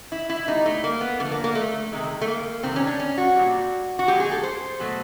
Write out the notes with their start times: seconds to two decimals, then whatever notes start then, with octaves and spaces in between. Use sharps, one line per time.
0.12 E4
0.30 E4
0.47 B2 G3 D#4
0.66 A3
0.84 A#3
1.01 B3
1.19 D3 F3 A3 A#3
1.31 A#3
1.44 A#3
1.55 A3
1.92 C3 D#3 G#3
2.21 A3
2.27 A#3
2.63 C3 D#3 G3 C4
2.76 C#4
2.87 D4
3.00 C#4
3.18 F#4
3.36 A#2 G3
3.99 F#4
4.08 A#2 F3 G#3 G4
4.20 G#4
4.32 A4
4.43 C5
4.80 B2 F#3 A3